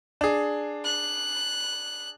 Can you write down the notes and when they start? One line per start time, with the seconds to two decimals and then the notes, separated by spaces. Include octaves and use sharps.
0.21 D4 G#4
0.85 F#6